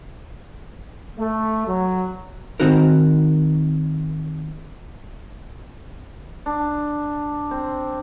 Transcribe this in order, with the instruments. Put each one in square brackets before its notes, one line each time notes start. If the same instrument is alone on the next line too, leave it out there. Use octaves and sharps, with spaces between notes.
[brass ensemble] A3
F#3
[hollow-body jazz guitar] D#3 G#3 C4 D#4 F#4 A#4
[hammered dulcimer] D4
C4